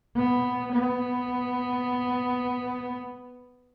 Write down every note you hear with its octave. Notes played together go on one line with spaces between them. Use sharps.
B3
B3